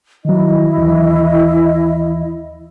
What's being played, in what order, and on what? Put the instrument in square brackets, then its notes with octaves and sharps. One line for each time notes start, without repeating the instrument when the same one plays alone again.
[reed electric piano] D#3 F#3 [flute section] E4 D#5
[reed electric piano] D#2 E3